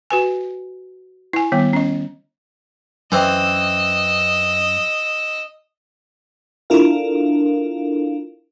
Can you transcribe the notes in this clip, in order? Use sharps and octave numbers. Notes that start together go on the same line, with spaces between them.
F#4 B4 G#5
E4 G#5
D#3 G3 B3
C#4 D#5
F#2 E3 C4 D#5 E6
D4 E4 F4 A4 A#4 F5